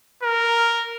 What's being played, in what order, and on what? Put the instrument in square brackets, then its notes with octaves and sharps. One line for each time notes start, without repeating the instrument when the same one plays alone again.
[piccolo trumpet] A#4